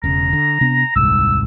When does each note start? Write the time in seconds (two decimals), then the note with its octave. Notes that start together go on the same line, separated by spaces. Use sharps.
0.04 E1 C#3 A#5
0.33 D3
0.61 C3 B3 D4
0.96 D#1 C2 G#2 E6